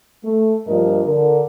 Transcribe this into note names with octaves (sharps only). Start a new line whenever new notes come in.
A3
G2 A#2 F3 D4 A#4 D#5
D3 A#4